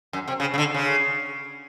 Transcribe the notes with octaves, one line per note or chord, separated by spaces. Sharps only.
F#2
C3
C#3
C#3
D3
C#3